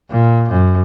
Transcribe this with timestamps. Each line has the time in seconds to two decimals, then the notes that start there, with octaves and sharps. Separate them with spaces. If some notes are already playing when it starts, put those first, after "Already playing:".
0.11 A#2
0.49 F#2